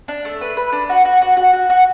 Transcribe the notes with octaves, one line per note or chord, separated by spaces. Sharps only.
D4
A3
B4
B4
D4
F#4
F#4
F#4
F#4
F#4
F#4